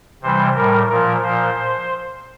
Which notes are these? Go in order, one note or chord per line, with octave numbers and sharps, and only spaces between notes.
C3 E3 G3 C5
A2 G3 A#4
A#2 F3 A#4
A#2 F3 C5